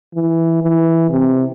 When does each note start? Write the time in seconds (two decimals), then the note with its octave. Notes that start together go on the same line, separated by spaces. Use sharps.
0.15 E3
0.63 E3
1.10 C3